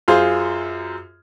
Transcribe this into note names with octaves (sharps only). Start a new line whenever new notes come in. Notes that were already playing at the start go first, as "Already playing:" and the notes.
F#2 F4 G#4 C5